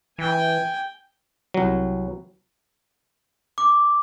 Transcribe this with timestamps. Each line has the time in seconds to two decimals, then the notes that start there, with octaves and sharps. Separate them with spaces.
0.18 E3 G5 G#5
1.54 C2 F#3
3.58 D6